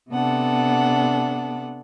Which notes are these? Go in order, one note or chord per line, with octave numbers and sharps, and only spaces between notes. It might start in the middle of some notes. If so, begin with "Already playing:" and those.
C3 B3 D4 A4 F#5